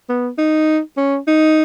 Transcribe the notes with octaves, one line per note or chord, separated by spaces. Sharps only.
B3
D#4
C#4
D#4